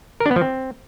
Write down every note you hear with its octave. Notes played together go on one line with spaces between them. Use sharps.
A#4
D4
B3
F3
C4